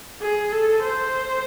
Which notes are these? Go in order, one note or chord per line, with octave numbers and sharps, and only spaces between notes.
G#4
A4
C5